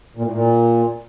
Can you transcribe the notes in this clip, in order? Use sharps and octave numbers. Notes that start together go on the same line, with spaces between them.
A#2
A2
A#2